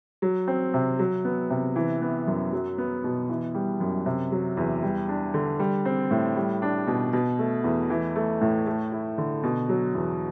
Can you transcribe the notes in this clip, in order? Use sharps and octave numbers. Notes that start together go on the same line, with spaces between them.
F#3
C4
C3
F#3
B3
C3
E3
B3
F#2
F#3
B3
B2
E3
G3
F#2
C3
F#3
E2
G3
D4
D3
G3
C4
A2
G3
D4
B2
B2
A3
E2
E3
A3
A2
A3
E4
D3
B2
F#3
E2